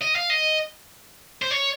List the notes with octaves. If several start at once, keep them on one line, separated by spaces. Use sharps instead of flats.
D#5
F5
D#5
C5
C#5